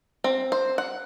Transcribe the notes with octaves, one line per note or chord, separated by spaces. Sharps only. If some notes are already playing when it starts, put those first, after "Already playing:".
C4
C5
F#5